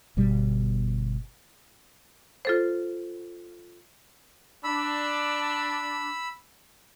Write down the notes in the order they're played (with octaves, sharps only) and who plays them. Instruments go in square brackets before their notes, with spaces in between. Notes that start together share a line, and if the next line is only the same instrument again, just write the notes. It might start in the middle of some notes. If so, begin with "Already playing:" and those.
[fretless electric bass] G1 B2 G3
[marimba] F4 A4 C5
[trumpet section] D4 [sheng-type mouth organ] B5 E6